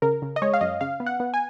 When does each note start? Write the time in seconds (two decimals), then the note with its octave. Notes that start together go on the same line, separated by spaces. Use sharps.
0.02 C#3 A#4
0.22 C#3
0.36 D#5
0.42 G#3 C#5
0.54 F5
0.61 F#2 D#5
0.81 C#3 F5
1.00 B3
1.06 F#5
1.20 B3
1.34 G#5